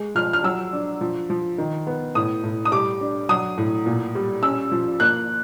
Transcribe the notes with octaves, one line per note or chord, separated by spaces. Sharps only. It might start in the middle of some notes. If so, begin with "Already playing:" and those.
Already playing: G#3
F3 F6
F6
F#3 E6
D4
F3
F3
D#3
B3
A2 D#6
A2
D#6
G3 D6
D4
F#3 D#6
A2
A#2
G3
C#4 E6
F3
A#3 F#6